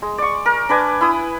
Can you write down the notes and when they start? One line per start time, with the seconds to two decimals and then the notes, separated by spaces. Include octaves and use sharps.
0.02 G#3
0.18 D5 C#6
0.46 A#4
0.69 D4 B4 D5 G#5
1.01 E4 D#6